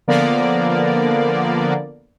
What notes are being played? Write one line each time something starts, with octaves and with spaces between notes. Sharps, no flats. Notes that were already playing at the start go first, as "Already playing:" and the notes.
D3 F3 A#3 B3 A#4 D5